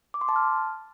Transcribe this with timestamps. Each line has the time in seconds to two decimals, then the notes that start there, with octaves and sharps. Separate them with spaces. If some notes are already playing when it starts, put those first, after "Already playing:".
0.14 D6
0.21 C6
0.29 A5
0.36 F6